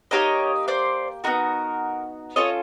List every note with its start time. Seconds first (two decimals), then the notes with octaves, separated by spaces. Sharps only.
0.11 A#3 D#4 G4 C#5 D#5
0.68 C5 D5
1.24 B3 D#4 F#4 A#4
2.36 C#4 F4 A4 C#5 D#5